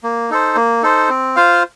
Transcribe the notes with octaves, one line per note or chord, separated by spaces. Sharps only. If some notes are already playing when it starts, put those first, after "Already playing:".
A#3
D#4 A4 C5
A#3
D#4 A4 C5
C4
F4 C5 F5